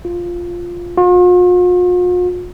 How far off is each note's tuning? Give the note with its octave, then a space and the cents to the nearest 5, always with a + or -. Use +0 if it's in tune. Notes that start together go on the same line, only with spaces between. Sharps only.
F4 +0
F4 +45